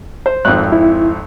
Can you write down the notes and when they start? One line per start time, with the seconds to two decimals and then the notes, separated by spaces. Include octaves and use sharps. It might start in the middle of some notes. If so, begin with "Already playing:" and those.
0.26 C5
0.45 G#1 F2 F#6
0.72 E4